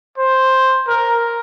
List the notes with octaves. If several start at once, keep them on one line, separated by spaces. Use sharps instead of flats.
C5
A#4